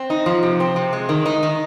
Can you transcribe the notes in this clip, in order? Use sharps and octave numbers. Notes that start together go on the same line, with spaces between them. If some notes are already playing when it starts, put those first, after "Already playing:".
Already playing: C4
D#4
F3
C3
C4
C3
G#3
D#3
D#4
D#3